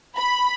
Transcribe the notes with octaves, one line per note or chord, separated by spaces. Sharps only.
B5